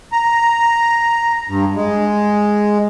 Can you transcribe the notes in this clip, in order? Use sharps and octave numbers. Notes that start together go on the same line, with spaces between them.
A#5
G2
G#3